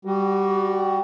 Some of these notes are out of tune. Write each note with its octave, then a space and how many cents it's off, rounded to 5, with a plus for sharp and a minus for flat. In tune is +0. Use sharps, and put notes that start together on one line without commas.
G3 +0 F#4 +20